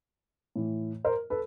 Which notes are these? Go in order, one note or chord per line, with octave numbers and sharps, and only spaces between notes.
A2 E3
A#4 C5
A4 B4